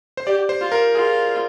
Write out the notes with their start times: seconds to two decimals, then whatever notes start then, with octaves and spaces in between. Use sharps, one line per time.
0.17 C5
0.26 G4 D5
0.49 C5
0.61 F4
0.72 A#4
0.95 F4 G#4